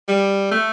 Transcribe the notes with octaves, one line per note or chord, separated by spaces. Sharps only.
G3
A3